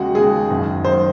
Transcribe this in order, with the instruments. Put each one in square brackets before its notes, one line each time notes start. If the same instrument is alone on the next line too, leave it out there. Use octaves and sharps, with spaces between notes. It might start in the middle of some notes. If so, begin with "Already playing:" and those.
Already playing: [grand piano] D#2 C#3 G#3 [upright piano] F#4
[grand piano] D#2 C#3 G#3 [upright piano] G#4
[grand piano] F#1 F#2 D#3
[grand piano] F#2 D#3 [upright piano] C5